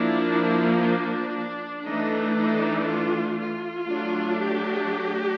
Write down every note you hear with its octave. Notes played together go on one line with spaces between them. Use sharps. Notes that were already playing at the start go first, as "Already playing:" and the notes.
Already playing: F3 A#3 D4 E4
E4
D4
E3 A3 D4 D#4
D#4
F4
F4
F#3 A3 D4
G4